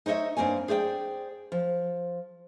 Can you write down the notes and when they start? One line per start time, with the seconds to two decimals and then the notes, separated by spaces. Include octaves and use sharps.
0.06 D#4 C5 C#5 D#5 E5
0.37 G2 A#3 C4 C#5 G#5
0.68 G#4 C5 D5 F5 G5
1.52 F3